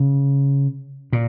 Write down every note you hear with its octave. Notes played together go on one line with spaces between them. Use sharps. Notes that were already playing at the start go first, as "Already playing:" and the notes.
Already playing: C#3
A#2